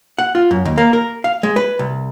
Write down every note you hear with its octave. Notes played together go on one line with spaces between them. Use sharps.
F#5
F4
F#2
D#2
A#3
A#4
F5
G#3
B4
C2